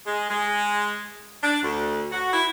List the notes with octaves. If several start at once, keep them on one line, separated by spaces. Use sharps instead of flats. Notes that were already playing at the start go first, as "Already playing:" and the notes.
G#3
G#3
D4
D2
F#4
E4